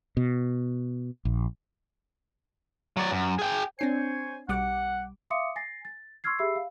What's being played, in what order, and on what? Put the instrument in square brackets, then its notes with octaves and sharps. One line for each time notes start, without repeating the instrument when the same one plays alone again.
[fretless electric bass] B2
A#1
[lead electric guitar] F#3 D5
F#2
G#4 G5
[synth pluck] C4 D4 C7 [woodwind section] C5 C#5 G#5
[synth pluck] B1 G3 D6 [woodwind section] F#5
[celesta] E5 F5 C6 D6 D#6 C#7
G#5 A6 A#6 C7
A6
C6 C#6 E6 F6 G#6 C7
G4 G#4 E5 B5 E6 C7
F5